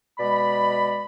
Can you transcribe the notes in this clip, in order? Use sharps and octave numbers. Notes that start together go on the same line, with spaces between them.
B2 G#3 D5 B5